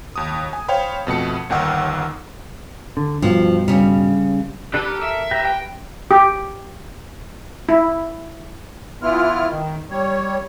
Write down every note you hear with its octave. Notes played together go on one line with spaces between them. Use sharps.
D#2 D#6
G#5
C5 C#5 F5 G5 B5
F2 B2 A3 C#7
G1 D#2 D#3 F#5 E6 F6
D3
G2 B2 F3
C#3 G3
D4 G4 A4 B4
A4 A#4
E5
G4 B4 A#5
G5
G4
E4
E3 B3 E4 F4 F6
D#3
G3 C#5